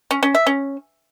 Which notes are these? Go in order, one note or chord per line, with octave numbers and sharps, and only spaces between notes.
C#4
C#4
E5
C#4